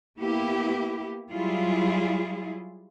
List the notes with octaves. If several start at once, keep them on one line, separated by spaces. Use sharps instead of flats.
A#3 B3 E4 G4
F#3 G3 E4 F4 G#4